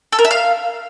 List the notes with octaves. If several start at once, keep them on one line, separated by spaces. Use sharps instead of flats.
A4
A#4
E5
F5